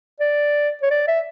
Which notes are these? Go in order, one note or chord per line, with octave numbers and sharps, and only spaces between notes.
D5
C#5
D5
E5